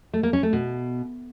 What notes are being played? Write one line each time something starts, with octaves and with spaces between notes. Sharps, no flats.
A3
A#3
C#4
A3
B2